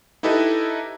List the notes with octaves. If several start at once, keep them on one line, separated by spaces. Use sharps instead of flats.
D#4 E4 G4 A4 B4 D#5